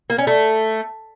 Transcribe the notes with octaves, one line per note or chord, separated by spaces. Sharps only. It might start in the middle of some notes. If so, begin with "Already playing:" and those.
A#3
C#4
A3